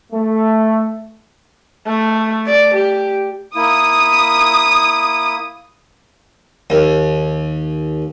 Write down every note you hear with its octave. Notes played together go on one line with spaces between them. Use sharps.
A3
A3
D5
G4
A#3 E4 D#6
D#2